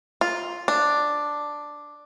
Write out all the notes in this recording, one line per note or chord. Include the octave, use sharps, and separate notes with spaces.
F4
D4